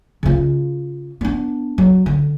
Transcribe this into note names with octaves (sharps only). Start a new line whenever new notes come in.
C#3 F4
B3 D4
F#3
D3